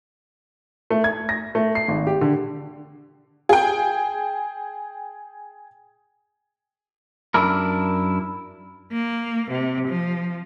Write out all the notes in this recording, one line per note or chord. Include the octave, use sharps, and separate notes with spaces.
A3
G#6
A#6
A3
C7
G#1
G4
D3
G#4 G5
F#2 D4 E4 A#4
A#3
C3
F3